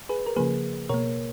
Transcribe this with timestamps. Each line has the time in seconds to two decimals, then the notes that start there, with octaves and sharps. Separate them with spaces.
0.09 G#4 B4
0.26 A#4
0.36 C#3 F3 A#3 G#4 B4
0.89 B2 A#3 A#4 C#5